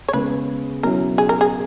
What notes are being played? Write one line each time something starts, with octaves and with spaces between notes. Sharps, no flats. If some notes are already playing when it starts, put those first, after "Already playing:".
C#5
C#3 G#3 B3 B4
B2 F#3 C#4 E4 A#4
G#4
A#4
G#4